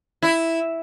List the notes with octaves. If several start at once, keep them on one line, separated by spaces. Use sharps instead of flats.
E4